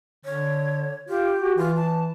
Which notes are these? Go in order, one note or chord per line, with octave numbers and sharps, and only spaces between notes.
D3 C#5
F4 G4
F#4
E3 F4
A5